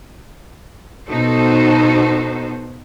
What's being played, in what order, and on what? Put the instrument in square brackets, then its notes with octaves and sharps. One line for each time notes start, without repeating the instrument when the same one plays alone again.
[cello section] B2 B3 D#4 F#4 A4 C5